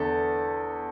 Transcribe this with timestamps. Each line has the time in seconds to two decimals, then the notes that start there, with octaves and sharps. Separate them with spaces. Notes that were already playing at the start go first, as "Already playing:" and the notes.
Already playing: E2 D3 A4